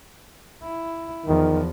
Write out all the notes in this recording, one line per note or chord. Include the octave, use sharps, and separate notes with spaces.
E4
E2 D#3 F3